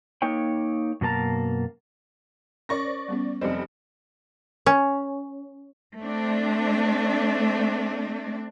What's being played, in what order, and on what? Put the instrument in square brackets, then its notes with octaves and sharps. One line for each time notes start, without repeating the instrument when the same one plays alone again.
[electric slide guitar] A#3 D#4 C#5 G5
F#2 B2 A#3 A5 A#5
[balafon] C#4 A#4 C#5 [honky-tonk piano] D5 C#6 A#6
[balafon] C5
G3 B3 C#4
[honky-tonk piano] F1 G3 C4 [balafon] F3 D5 D#5
[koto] C#4
[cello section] A3 C4 D4